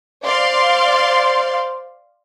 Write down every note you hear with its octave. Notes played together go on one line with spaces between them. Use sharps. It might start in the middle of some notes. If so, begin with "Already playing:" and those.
C5 D5 F5 C6